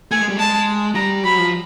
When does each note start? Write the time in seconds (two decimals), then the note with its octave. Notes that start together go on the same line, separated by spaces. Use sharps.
0.11 A3 G#5
0.20 G#3
0.29 G3
0.37 G#3 A5
0.95 G3 A#5
1.24 F#3 B5
1.38 F3